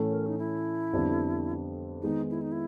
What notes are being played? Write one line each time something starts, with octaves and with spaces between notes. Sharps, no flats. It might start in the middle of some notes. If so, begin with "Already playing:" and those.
Already playing: A2 E3 A3 C#4
A#4
D#4
E4
F2 D3 G3 B3 D4
D#3 G#3 B3 D#4
E4
D#4
E4